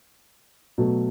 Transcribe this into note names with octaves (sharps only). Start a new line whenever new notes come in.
B2 F#3 A3